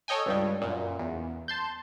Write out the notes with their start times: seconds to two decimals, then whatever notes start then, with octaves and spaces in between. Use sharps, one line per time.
0.08 A4 C#5 D#5 G5 G#5
0.26 C#2 G2 G3
0.62 F#2 A#2
0.99 E2
1.48 A5 C6 G6